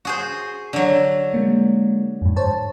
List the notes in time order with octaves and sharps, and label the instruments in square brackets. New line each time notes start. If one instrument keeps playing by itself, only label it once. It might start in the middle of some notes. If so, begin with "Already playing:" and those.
[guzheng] F#4 G#4 C5
D3 F#3
[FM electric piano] G#3 A#3
F2 G#2
C5 C#5 A5